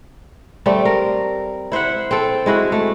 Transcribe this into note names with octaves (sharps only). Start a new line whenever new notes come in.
G3 A3 C4
A#4
E4 C5 E5 F#5
C4 A4
G#3 E4 F#4
A3